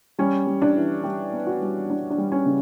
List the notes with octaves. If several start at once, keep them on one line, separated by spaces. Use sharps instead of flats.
G3 C#4
G3
D4
E3
G3 G4
B3
F#4
G3
G3 D4
D4
G3
C#4
C#3